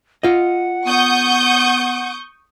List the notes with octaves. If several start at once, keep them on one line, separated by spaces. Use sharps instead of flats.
F4 D#5 F#5
B3 C#6 D#6 G6